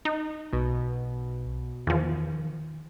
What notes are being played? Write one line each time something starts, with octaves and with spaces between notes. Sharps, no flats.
D#4
B1 B2
E2 D#3 F3